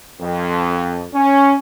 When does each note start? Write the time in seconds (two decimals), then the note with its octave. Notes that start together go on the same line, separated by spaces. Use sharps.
0.21 F2
1.14 C#4